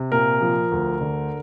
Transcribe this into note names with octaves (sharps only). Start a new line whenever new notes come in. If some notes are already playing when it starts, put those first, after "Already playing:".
Already playing: C3
A#2 A#4
F3
D2
D3